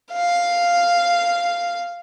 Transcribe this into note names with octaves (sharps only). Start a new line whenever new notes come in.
F5